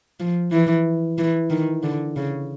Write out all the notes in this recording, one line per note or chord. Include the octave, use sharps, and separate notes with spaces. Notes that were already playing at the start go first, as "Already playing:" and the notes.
F3
E3
E3
D#3
D3
C#3